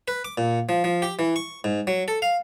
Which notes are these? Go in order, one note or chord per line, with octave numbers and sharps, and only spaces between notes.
B4
D6
A#2
F3
F3
G4
E3
C#6
G#2
F#3
A4
F5